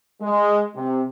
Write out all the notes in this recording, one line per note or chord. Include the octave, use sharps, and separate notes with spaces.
G#3
C3